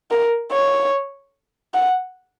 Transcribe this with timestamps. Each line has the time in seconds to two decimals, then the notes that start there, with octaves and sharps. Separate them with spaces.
0.11 A#4
0.52 C#5
1.74 F#5